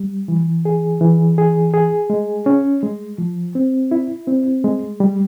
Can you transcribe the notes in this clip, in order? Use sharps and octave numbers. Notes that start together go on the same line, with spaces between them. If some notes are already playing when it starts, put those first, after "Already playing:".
Already playing: G3
E3
G#4
E3
G#4
G#4
G#3
C#4
G#3
F3
C4
E4
C4
G#3
G3